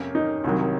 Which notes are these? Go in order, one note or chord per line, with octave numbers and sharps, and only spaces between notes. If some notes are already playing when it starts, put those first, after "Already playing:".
Already playing: F2 C3 A#3 C#4
D#4
C2 C3 D#3 F#3